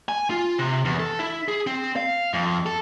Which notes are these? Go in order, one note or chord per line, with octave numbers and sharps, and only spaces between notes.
G#5
F4
C3
E2
A4
E4
G#4
C4
F5
F2
A4